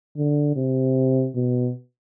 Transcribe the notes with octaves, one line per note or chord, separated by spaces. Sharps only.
D3
C3
B2